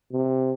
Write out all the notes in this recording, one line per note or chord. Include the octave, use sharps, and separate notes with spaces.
C3